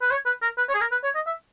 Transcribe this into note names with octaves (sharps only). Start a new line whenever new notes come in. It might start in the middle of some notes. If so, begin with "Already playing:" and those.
B4
C#5
B4
A#4
B4
C#5
G#4
A#4
B4
C#5
D#5
E5